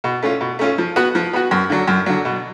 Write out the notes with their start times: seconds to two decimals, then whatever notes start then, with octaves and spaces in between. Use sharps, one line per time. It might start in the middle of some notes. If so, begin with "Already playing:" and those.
0.04 B2
0.23 A3 C#4 F4
0.41 B2
0.59 A3 C#4 F4
0.78 F3
0.96 B3 F#4
1.15 F3
1.33 B3 F#4
1.51 F#2
1.70 D3 F#3
1.88 F#2
2.06 D3 F#3
2.25 B2